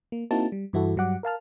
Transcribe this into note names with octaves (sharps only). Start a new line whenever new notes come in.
A#3
A#3 C4 D#4 E4 F#4 A5
G3
G2 E3 E4 F#4 A4
G2 F#3 G3 F#5 D6
A#4 F5 A5 F6